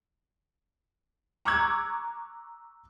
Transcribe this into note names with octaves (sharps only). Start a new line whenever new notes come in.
A#5 C#6 D6 E6 F#6 G#6